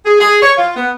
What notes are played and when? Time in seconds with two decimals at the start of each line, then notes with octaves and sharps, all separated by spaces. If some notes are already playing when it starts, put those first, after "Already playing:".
0.06 G#4
0.21 G#4
0.42 C#5
0.58 F4
0.76 B3